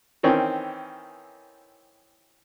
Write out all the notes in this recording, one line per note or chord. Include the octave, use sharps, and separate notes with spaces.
D#3 E3 C4 C#4